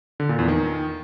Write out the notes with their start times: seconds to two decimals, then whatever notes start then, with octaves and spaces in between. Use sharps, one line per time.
0.20 D3
0.29 A#2
0.39 E2
0.48 D#3